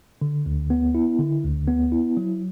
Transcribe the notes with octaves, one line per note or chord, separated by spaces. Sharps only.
D3
D2
B3
E4
D3
D2
B3
E4
F#3